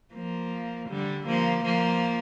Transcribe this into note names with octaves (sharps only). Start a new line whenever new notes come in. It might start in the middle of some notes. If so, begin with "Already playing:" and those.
F3 A#3
D3 G3
F3 A#3
F3 A#3